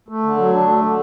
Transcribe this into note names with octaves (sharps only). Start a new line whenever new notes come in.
A3
D3
F#3
D4
A3
D3